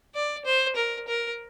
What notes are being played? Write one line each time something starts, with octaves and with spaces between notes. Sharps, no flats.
D5
C5
A#4
A#4